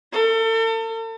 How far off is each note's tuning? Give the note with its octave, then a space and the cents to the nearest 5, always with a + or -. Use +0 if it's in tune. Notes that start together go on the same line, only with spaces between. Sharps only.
A4 +40